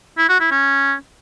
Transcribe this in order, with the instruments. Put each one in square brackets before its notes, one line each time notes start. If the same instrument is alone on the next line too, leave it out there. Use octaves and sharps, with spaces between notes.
[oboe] E4
F#4
E4
C#4